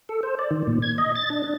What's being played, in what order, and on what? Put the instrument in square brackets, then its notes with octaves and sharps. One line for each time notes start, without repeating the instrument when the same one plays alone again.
[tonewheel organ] A4
C5
D5
D#3
A#2
G#6
D#5
A6
D4
D4